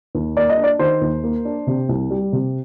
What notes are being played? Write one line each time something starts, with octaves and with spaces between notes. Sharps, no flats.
D#2
A#3 D5
D#5
D4
D5
D#3 C5
D#2
A#3
D4
C3
C2
G3
C3